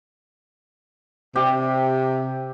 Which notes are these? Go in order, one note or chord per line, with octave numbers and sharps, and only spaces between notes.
C3 G4